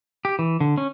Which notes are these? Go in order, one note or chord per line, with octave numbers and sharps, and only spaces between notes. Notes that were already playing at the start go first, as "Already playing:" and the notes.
G4
E3
D3
C#4